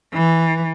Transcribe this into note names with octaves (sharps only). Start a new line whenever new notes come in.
E3